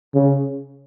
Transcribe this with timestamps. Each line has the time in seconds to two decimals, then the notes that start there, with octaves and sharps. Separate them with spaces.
0.15 C#3